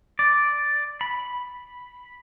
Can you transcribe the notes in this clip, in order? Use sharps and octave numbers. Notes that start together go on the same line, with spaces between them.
D5
B5